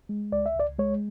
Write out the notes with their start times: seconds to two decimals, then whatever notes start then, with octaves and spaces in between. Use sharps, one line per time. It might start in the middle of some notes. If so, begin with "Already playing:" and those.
0.09 G#3
0.32 C#2 D5
0.46 E5
0.56 C#2 D5
0.79 G#3 C#5